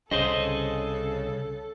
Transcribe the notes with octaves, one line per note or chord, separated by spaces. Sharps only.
C2 C#3 G#4 A4 C5 D#5